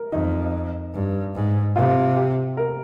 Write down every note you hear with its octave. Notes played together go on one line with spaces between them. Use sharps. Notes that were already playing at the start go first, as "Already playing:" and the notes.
Already playing: A#4
F2 D#4
G2
G#2
C3 F4
G4
A#4